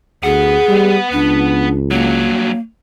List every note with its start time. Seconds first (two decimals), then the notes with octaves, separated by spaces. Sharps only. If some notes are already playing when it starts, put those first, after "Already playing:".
0.23 D2 B3 G#4 F#5
0.69 G3
1.12 C#2 D4
1.91 G2 F#3 A#3